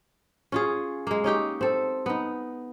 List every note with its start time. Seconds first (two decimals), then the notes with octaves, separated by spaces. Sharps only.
0.52 C#4 F4 G#4
1.07 G#3 A#3
1.24 C#4 D#4 G4 G5
1.61 C4 A4
2.06 B3 D#4